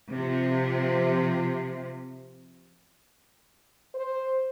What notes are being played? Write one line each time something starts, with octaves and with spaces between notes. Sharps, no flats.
C3 F3
C5